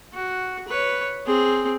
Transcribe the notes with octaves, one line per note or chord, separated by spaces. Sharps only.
F#4
B4 C#5
C4 G#4